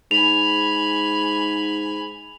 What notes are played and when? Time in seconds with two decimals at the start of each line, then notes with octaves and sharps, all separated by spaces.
0.11 G#2 G#5 B5 F7